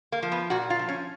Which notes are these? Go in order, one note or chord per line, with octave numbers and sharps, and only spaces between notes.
A#3
F3
B3
A#2 F#4
F4
F3
C#4